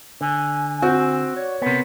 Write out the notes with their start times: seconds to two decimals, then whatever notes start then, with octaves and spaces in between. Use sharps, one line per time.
0.21 D3 G#5
0.82 C4 F#4
1.36 C#5 D5
1.62 C3 B3 A#4